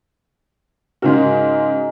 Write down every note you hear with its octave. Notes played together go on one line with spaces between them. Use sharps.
G#2 C#3 G#3 F#4 A#4